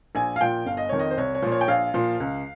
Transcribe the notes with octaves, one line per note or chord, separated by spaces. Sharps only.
A#1 G#5
F5
A#2 F3 G5
G1 F5
D#5
F2 D#3 C#5
D#5
C5
C2 C#5
C#5
A#2 F3
C#5
G5
A#1 F5
A#2 F3
C#2